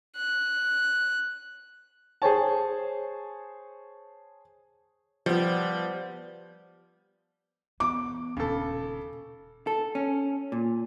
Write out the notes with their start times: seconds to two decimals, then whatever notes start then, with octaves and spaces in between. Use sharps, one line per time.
0.16 F#6
2.22 G#4 C5 C#5 A5
5.26 F3 G3 B3
7.80 E3 B3 D6
8.37 D#1 C#3 A4
9.67 A4
9.95 C#4
10.52 A#2